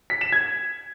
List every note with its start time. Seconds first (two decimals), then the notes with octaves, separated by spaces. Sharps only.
0.10 B6
0.21 E7
0.32 G#6